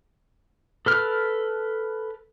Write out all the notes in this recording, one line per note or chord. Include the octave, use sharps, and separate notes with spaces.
A4 B4 F6